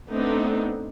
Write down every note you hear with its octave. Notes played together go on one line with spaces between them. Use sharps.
A3 B3 C4 D4 D#4